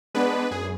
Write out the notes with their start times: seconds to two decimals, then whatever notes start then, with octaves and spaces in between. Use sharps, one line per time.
0.14 G#3 B3 D4 B4
0.51 F#2 G#4